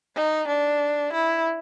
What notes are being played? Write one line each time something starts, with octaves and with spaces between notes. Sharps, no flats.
D#4
D4
E4